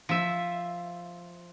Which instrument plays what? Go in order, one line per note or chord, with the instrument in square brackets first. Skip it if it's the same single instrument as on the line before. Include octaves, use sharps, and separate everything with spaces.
[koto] F3 E5